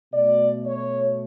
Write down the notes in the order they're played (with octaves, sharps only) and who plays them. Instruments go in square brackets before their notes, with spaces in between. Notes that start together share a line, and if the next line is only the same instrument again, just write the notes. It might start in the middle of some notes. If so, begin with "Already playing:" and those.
[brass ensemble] B2 A3 D5
C#5